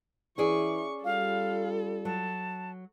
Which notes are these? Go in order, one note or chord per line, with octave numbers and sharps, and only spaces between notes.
E3 C#4 E4 G#4 D5 C#6
G3 F4 A4 F5
F#3 A5